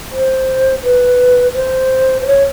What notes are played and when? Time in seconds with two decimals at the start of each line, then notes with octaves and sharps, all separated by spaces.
0.11 C5
0.83 B4
1.54 C5
2.22 C5
2.27 C#5